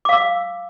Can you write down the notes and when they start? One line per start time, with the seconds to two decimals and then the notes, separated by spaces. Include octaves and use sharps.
0.05 D6
0.09 F5
0.13 E6